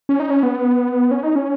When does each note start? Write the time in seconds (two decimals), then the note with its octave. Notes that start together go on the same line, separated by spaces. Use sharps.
0.09 C#4
0.20 D#4
0.30 C#4
0.43 B3
1.11 C#4
1.23 D#4
1.35 C#4